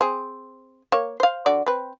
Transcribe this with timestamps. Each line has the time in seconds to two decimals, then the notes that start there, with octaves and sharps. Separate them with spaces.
0.01 C4 G#4
0.92 A#3 C#5
1.20 C5 F5
1.46 D3 F#4 D5
1.66 C4 B4